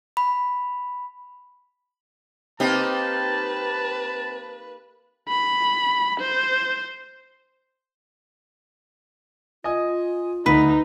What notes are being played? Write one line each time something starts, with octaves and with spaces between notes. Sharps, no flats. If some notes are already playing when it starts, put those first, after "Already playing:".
B5
A#3 C4 D#4 G4 B4 A5
B5
C5
F4 D#5 G#5 D#6
D2 D#4 B4